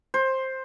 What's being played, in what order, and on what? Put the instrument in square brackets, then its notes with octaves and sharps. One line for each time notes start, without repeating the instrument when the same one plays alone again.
[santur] C5